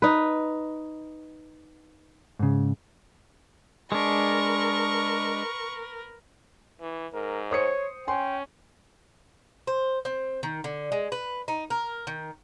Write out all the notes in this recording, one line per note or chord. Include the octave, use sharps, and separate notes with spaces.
D#4 B4
G#2 C#3
G#3 D4 A#4 B4 C#6
E3
G#2 A#4
C5 C#5 D#6 C#7
C#4 G5 G#5 C6
C5
C4
D#3
D3
G#3
B4
D#4
A#4
D#3